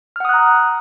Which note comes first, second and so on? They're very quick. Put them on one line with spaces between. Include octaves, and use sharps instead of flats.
F6 F#5 D#6 F#6 A#5